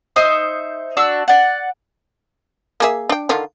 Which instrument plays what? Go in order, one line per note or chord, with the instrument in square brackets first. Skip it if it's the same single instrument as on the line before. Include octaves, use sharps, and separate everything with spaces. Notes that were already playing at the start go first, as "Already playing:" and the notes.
[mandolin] D#4 C5 E5 D#6
D4 F#4 E6
D5 F#5
[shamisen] A#3 G#4 E5
D4 G5
D3 D#3 F4